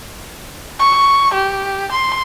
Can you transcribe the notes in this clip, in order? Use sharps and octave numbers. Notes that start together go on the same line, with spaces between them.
C#6
G4
C6